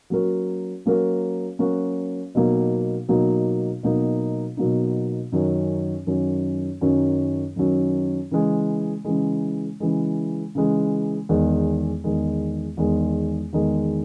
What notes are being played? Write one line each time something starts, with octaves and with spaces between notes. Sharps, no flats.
F#3 A#3 C#4 F#4 A#4
F#3 A#3 C#4 F#4 A#4
F#3 A#3 C#4 F#4 A#4
B2 F#3 A#3 D#4
B2 F#3 A#3 D#4
B2 F#3 A#3 D#4
B2 F#3 A#3 D#4
F#2 D#3 F#3 C#4
F#2 D#3 F#3 C#4
F#2 D#3 F#3 C#4
F#2 D#3 F#3 C#4
C#3 E3 G#3
C#3 E3 G#3
C#3 E3 G#3
C#3 E3 G#3
E2 D#3 G#3
E2 D#3 G#3
E2 D#3 G#3
E2 D#3 G#3